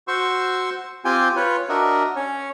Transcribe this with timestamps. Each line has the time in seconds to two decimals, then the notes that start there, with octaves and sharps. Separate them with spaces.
0.08 F#4 C5 C6 C#6 E6
1.05 C4 F4 G4 G5 G#5
1.36 F4 B4 C#5
1.69 D4 F#4 A#4 D#5 E5
2.16 C#4 C#5